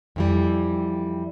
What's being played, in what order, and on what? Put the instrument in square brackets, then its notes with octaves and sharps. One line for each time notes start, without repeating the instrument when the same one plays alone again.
[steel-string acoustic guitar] F2 E3 G3